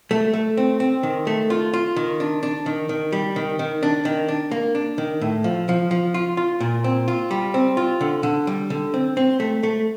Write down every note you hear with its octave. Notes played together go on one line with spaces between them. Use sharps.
A3
A3
C4
C4
D#3
A3
F4
F4
D#3
D4
D4
D#3
D#3
G3
D#3
D#3
D4
D#3
D4
A#3
D4
D#3
A2
F3
F3
F3
F4
F4
A#2
C4
F4
G3
C4
F4
D3
D3
G3
D3
C4
C4
A3
A3